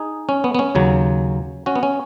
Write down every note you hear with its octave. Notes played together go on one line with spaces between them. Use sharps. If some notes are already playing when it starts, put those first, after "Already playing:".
Already playing: D#4 G#4
C#4
B3
B3
C#4
D#2 C#3 F#3
C#4 F#4
B3
C#4